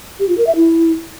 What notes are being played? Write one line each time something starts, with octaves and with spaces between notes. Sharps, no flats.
G4
F4
A#4
E5
E4